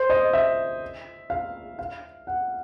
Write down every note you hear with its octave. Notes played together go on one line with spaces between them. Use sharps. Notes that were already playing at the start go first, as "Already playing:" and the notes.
Already playing: C5
D#5
E5
F5
F5
F#5